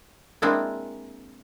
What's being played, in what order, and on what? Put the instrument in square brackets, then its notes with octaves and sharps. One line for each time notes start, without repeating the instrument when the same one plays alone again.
[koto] G#3 A#3 C4 D4 E4 G#4